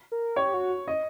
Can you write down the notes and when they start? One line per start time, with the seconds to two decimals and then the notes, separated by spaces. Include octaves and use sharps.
0.12 A#4
0.36 G4 C#5
0.54 F#4
0.88 D#5